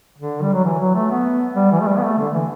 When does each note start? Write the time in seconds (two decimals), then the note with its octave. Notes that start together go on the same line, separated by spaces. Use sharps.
0.18 D3
0.42 G3
0.53 F#3
0.64 E3
0.80 F#3
0.95 A3
1.10 B3
1.56 G3
1.72 E3
1.80 A3
1.87 G3
1.97 B3
2.03 A3
2.18 D3
2.34 E3